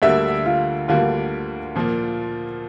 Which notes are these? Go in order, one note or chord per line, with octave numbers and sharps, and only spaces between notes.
D2 D3 G3 A#3 E5
F4
D2 D3 G3 A#3 F4
A#2 F3 A#3